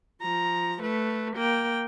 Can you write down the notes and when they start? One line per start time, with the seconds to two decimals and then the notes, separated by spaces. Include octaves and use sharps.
0.22 F3 A#5
0.82 A3 B4
1.36 A#3 G5